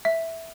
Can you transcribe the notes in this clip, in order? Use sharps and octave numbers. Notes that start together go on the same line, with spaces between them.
E5